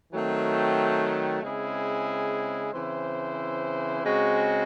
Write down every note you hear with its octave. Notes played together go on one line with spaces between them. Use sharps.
D#3 F#3 A3 C4
C#3 G#3 C4 E4 G#4
C#3 E3 C4 E4 C5
C#3 G#3 C4 F#4